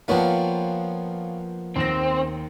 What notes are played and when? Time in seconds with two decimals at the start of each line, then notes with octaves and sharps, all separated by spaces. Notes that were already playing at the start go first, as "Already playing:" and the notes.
0.08 F3 A#3 B3 D4 F4 B4 C#5 G5
1.76 D#2 C4 A#6